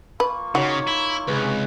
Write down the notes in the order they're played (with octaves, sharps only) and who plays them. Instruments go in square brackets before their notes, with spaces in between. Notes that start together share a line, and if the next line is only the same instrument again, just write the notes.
[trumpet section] A#3 F4 C#6 [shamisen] B4
[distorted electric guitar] C#3 [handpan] D#4 C#5 [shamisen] F#4
[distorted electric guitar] E4
[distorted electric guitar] C#2 [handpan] C3 G#4 B4